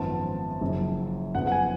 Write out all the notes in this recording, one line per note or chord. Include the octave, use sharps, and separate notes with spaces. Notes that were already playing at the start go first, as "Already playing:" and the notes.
Already playing: G#1 F#2 F3 B3 A5
F#1 F#2 F3
F#1 F2 C#3 F3 B3 F#5
F#5
G#5